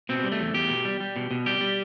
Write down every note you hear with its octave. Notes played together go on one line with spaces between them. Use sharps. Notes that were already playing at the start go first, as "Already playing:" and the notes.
B2 C4
G3
A3
E2
E2 G4
B2
G3
G3
B2
B2
G3 G4
G3